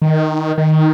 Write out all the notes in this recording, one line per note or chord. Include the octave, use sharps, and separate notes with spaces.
D#3
D#3